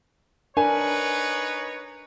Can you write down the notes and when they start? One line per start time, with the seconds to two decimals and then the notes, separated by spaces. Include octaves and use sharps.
0.57 D4 D#4 A#4 B4 C#5 G#5